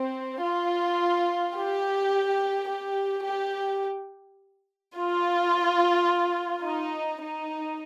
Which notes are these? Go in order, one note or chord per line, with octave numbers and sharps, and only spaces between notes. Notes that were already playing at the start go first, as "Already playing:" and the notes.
Already playing: C4
F4
G4
G4
G4
F4
D#4
D#4